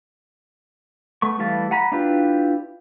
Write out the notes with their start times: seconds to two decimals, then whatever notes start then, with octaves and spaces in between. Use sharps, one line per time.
1.22 A3 B3 C#6
1.39 E3 G3 A3 F5 A5
1.71 F#5 G#5 A#5 B5
1.92 D4 E4 F4 G4 B4